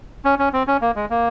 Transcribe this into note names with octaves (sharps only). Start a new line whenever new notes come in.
C#4
C#4
C4
C#4
A#3
G#3
A#3